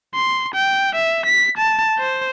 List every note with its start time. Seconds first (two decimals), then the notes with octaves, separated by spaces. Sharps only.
0.15 C6
0.54 G5
0.95 E5
1.26 B6
1.57 A5
1.98 C5